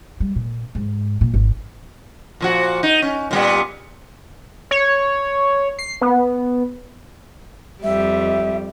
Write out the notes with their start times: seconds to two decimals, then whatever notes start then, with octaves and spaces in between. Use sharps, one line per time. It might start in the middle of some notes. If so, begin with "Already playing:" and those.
0.20 G3
0.36 A#2
0.75 G#2
1.21 A#2
1.34 G#1
2.41 A#2 F3 F#4
2.83 D#4
3.02 C#4
3.31 A#2 G3 B3
4.71 C#5
5.79 C7
6.01 B3
7.83 F2 G3 E5